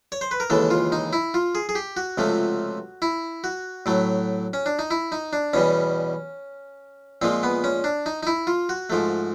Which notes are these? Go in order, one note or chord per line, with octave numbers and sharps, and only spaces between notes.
C#5
C5
B4
A#4
D#2 C#3 E3 G#3 A4
F4
D#4
E4
F4
G#4
G#4
G4
F#4
C#2 C3 F3 A3
E4
F#4
A2 F#3 A3
C#4
D4
D#4
E4
D#4
D4
E2 B2 G3 C#4
A#2 F3 G#3 C4
B3
C#4
D4
D#4
D#4
E4
F4
F#4
G#2 F3 A3